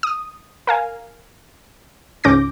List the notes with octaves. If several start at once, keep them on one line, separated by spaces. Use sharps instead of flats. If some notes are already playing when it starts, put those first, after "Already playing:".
D#6
A#4 F5 G#5
C#2 G#2 C#4 D6 G6 A#6